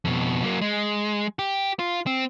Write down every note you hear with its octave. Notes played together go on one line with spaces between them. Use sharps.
F2 B2
F#3 A#3
G#3
G4
F4
C4